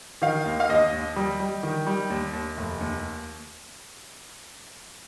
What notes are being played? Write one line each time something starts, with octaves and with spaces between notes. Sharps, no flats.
D#3 F5
D#2
F5
D#2 D#5
D#2
G3
G3
D#3
G3
D#2
D#2
F1
D#2